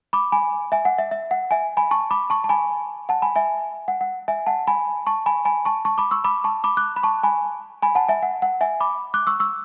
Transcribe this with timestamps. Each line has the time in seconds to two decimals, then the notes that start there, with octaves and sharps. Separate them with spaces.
0.13 B5 D6
0.32 G#5 B5
0.72 E5 G#5
0.85 F#5
0.98 E5
1.11 E5
1.31 F#5
1.51 E5 G#5
1.77 G#5 B5
1.91 A5 C#6
2.11 B5 D6
2.30 A5 C#6
2.44 A5
2.49 G#5 B5
3.09 F#5 A5
3.22 G#5 B5
3.36 E5 G#5
3.88 F#5
4.01 F#5
4.28 E5 G#5
4.47 F#5 A5
4.67 G#5 B5
5.07 A5 C#6
5.26 G#5 B5
5.45 G#5 B5
5.65 A5 C#6
5.85 A5 C#6
5.98 B5 D6
6.11 C#6 E6
6.24 B5 D6
6.44 A5 C#6
6.64 B5 D6
6.77 D6 F#6
6.96 B5
7.03 A5 C#6
7.23 G#5 B5
7.82 G#5 B5
7.95 F#5 A5
8.08 E5 G#5
8.22 F#5
8.42 F#5
8.61 E5 G#5
8.80 B5 D6
9.14 D6 F#6
9.27 C#6 E6
9.40 C#6 E6